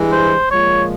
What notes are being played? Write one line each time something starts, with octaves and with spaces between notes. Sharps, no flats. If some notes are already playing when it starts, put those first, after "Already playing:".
Already playing: G2 E3 G#3
C5
A#2 F3 G#3 C#5